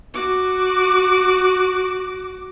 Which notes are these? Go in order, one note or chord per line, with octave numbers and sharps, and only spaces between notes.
F#4 D6